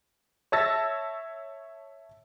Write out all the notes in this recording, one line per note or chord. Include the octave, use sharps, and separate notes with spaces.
C#5 E5 A5 E6 A6 A#6